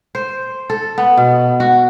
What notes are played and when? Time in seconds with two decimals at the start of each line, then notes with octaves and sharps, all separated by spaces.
0.15 C5
0.70 A4
0.98 B3
1.18 B2
1.60 F#4